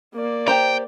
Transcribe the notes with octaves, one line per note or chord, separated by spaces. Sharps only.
A#3 D5
G4 C5 G5 A#5